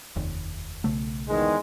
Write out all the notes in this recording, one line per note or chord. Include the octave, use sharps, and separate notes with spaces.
F1 D#2
B1 C#3 A3
E2 D#3 G#3